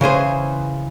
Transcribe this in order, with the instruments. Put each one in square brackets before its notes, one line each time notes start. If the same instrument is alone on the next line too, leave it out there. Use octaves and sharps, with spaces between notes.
[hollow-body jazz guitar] C#3 E3 G#4 C5